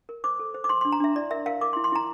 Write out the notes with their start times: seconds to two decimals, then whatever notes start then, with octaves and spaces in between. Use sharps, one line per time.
0.09 A#4
0.24 C5 D6
0.39 A4
0.54 C5
0.64 D6
0.69 C5 C6
0.81 D4 C6
0.92 A#5
1.00 D4 E5
1.15 E4 D5
1.31 A#4 E5
1.46 A#4 F5
1.61 A#4 D6
1.73 C6
1.77 E4
1.84 C6
1.92 E4 A#5